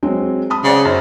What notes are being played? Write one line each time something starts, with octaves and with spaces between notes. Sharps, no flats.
F#3 G#3 C4
A5 B5 D#6
C#3 C5 D5 F#5
F#2 C5